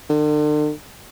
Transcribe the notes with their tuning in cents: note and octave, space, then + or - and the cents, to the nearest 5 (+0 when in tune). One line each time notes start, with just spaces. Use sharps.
D3 +40